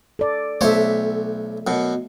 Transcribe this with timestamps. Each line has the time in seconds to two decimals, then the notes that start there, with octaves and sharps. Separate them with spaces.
0.19 A4 D5
0.61 B1 A3 A4 C5 C#5 E5
1.67 F#2 B2